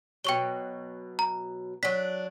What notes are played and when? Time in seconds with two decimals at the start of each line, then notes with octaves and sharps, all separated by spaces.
0.25 B2 F#3 G5 C#6 G7
1.19 A#5
1.83 F#3 D4 B6